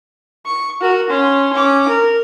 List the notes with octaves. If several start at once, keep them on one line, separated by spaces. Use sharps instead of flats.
C#6
F#4 A#4
C#4 C6
C#4 D6
A#4